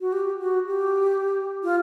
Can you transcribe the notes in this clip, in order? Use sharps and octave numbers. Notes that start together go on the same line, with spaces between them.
F#4
G4
F#4
G4
F4